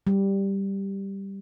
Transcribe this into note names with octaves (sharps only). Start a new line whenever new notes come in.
G3